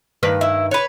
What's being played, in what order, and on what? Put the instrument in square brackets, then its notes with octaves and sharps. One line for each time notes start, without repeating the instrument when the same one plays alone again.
[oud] G2 D#3 B4
[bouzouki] E4
B4 C#5